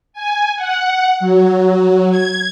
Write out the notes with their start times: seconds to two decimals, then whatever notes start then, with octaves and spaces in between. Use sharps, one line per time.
0.13 G#5
0.56 F#5
1.20 F#3
2.10 G#6